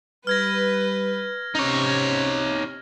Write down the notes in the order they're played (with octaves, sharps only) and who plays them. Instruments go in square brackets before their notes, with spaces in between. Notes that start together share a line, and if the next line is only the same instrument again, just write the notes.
[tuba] G3 [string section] B4 [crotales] F6 G#6 A#6
[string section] C3 [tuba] C#4 [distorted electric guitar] D#4 C#5